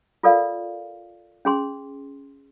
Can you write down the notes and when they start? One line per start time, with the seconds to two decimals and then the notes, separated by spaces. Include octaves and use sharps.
0.23 F4 A4 A#4 D5 F5
1.45 C#4 G#4 C6